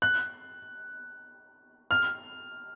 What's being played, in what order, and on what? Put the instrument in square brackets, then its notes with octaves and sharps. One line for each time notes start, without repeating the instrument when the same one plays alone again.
[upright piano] F#6
F6